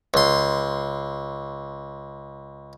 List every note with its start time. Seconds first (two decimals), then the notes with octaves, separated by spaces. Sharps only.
0.14 C#2 C6